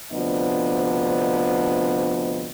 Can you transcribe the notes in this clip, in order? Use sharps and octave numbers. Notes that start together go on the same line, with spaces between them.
D2 C3 F3 B3 D4 D#5